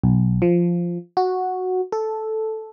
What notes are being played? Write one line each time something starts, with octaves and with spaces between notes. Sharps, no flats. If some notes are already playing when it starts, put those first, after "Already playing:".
B1
F3
F#4
A4